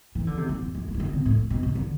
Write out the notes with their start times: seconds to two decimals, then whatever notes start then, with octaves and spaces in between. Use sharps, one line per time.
0.15 E3
0.27 D3
0.37 C3
0.49 B2
0.62 E2
0.75 F2
0.88 G2
0.94 E3
1.00 D3
1.13 C3
1.25 A2
1.38 A2
1.50 B2
1.63 C3
1.75 D3